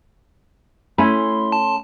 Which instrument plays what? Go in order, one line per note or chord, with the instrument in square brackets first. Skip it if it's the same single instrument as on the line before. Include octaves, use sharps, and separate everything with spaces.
[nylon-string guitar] A3 C#4 [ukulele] E4 G#5 B5 [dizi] C6
[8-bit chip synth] A5